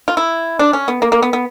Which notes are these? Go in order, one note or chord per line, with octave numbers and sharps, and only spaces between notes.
F4
E4
D4
C#4
B3
A#3
A#3
B3
B3